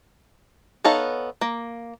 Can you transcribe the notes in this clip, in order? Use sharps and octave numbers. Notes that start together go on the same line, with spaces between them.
B3 D#4 A4 C#5 F5
A#3